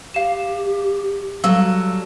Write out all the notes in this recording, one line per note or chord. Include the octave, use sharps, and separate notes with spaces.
G4 F5 E7
F#3 G3 A4 F5 E6